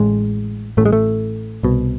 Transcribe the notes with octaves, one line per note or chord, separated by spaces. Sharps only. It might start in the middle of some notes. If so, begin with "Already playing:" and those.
Already playing: A1 A2 G#3
A1 A2 A3
G#3
A3
C2 B2